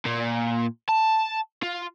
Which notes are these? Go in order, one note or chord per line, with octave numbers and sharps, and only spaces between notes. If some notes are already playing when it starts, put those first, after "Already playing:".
A#2
A5
F4